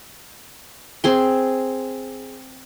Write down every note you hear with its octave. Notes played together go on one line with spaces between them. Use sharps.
C4 G#4 C6